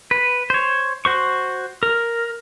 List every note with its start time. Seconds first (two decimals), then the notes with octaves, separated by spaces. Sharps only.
0.11 B4
0.50 C5 C#5
1.05 F#4 C5 C#6
1.83 A#4